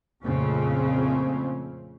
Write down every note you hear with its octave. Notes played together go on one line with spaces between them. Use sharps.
F2 A#2 C#3 A3 C4 C#4